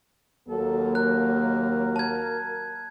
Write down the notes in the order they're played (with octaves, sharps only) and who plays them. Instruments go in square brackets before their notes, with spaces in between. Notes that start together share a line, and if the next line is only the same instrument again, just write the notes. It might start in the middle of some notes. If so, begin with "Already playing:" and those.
[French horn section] D#2 F#3 A#3 [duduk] A4
[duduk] A#4 [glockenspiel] F#6
[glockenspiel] A5 G#6